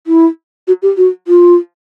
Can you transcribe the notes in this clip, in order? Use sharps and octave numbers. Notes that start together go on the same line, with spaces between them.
E4
F#4
G4
F#4
F4